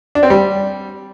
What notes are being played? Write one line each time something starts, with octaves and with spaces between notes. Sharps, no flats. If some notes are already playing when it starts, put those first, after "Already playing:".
D4
C4
G3